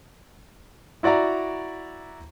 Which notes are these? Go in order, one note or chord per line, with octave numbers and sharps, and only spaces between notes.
E4 F#4 D5 E5 A#5